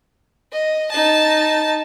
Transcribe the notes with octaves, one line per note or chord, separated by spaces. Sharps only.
D#5
D#4 A5